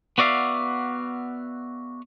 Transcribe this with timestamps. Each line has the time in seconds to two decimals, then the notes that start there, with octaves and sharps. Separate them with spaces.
0.18 B3 F#4 D5 E5 F5